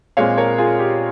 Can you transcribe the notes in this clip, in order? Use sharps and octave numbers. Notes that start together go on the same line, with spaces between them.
A#2 G#3 C4 C#5 F5
A#4 C#5
F4 G#4
G4